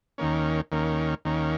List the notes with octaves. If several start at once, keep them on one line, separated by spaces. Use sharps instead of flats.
D#2 D#3 A#3 C#4
D#2 D#3 A#3 C#4
D#2 D#3 A#3 C#4